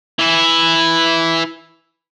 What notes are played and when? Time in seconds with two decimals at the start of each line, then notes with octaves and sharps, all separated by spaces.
0.19 E3 E4